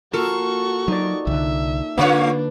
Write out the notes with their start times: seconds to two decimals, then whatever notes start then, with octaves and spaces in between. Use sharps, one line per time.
0.13 A#3 F4 F#4 A4 A#4 C#6
0.88 F#3 D#4 D5
1.27 C2 D3 E5
1.98 D3 A3 A#3 D4 F4 B4 C#5